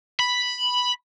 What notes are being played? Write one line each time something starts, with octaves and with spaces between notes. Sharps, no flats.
B5